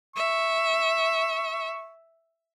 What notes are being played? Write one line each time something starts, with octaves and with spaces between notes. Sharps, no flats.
E5 C#6